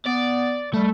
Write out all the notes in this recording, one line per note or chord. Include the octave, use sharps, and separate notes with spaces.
B3 D5
G3 A3